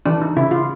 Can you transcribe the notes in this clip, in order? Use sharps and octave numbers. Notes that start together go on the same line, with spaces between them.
E3 D4
D#4
C#3 E4
F4